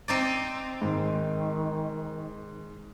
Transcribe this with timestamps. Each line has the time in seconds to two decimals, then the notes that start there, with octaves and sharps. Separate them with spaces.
0.08 C4 D#4 D5
0.82 G#2 D#3